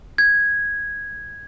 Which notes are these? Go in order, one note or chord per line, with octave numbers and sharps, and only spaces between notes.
G#6